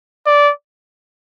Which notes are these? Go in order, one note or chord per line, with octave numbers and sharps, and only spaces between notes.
D5